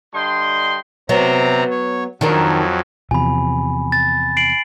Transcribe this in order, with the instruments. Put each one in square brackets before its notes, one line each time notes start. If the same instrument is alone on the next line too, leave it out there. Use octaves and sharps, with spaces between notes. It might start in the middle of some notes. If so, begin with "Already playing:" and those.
[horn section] G2 D3 D#5 G5 C6
[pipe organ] C3 C4 A#5 [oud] F#3 B3
[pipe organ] C#5
[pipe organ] F2 F#3 [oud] D#3 D4 A#4
[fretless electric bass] E2 C3 F3 [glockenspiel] G#5 B5
[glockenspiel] A6
C7 D7 F#7